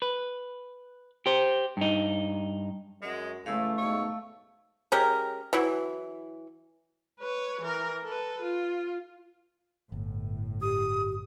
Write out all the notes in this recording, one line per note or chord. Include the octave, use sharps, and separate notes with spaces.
B4
G4 C5
G2 D#4
F#2 G#3
A2 C#3 E3 A3 C#4 F5 E6
G#2 B2 C#5
G#3 C#4 G4 A#4
E3 F#3 E4
B4 C#5
E3 A#4
A4 B4
F4
G1 A2
G4 D#6